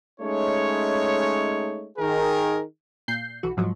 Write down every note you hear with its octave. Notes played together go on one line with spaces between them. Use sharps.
G#3 A3 C#4 D#4 C#5
D#3 G#4 A#4
A#2 G6 C7
B1 E3 F#4
G#2 F3 F#3